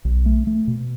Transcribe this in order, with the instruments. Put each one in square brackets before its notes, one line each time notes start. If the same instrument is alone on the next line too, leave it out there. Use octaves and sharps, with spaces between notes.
[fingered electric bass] B1
A3
A3
B2